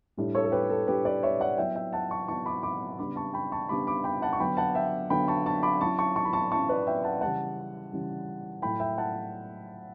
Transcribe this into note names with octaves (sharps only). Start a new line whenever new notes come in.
A2 G3 D4
A4 C#5
A4
G4 B4
A4
A2 G3 D4 G4 B4
B4 D5
C#5 E5
D5 F#5
F#3 B3 E4 E5 G5
E5 G5
F#5 A5
A5 C#6
F#3 B3 E4 A5 C#6
B5 D6
B5 D6
C#3 G3 B3 D4 B5 D6
A5 C#6
G5 B5
A5 C#6
C#3 G3 B3 D4 B5 D6
B5 D6
G5 B5
F#5 A5
C#6
D3 F#3 B3 G5 B5
F#5 A5
E5 G5
D3 F#3 B3 G5 B5
A5 C#6
A5 C#6
B5 D6
F#3 C#4 E4 A5 C#6
A5 C#6
A5 C#6
B5
A5 C#6
F#3 C#4 E4 A5 C#6
B4 D5
E5 G5
F#5 A5
C#3 E3 G3 C#4 F#5 A5
C#3 E3 G3 C#4
A2 F#3 A3 E4 G5 B5
E5 G5
F#5 A5